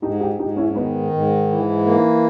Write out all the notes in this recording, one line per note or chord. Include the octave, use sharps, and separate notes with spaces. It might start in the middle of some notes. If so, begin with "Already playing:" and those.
G#2 D#4 G4
D#4 G4
G#2 D#4 G4
C#4 E4
C#4
D#3 B3 D#4
G#2
E3
A#3